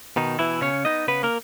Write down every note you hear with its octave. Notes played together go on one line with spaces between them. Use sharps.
B2 D#3 D#4
B2 E3 E4
C#3 C#4 C#5
B3 D#4 D#5
C#3 B3 B4
A#3 A#4